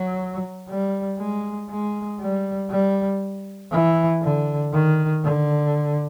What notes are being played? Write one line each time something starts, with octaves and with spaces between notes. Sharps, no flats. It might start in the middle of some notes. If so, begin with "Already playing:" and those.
Already playing: F#3
G3
G#3
G#3
G3
G3
E3
D3
D#3
D3